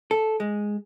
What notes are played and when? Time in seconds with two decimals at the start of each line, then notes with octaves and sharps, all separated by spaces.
0.11 A4
0.40 G#3